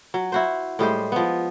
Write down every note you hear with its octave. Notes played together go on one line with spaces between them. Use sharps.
F#3
E4 F#4 C5
A2 G3 G#3 C5
F3 B3